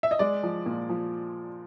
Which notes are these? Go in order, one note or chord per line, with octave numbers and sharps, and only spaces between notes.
E5
D#5
G#3 D5
F3
A#2
F3